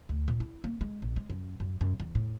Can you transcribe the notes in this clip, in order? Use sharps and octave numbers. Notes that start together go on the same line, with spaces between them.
D2
A#2
E4
A#3
G#3
A#1
G#3
F#2
F#2
F#2
E2
A2